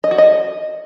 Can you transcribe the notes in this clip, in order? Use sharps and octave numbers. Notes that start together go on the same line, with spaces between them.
D#5
F#4
D#5